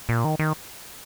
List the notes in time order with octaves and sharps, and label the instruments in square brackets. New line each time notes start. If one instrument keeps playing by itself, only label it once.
[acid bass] A#2
D#3
D#3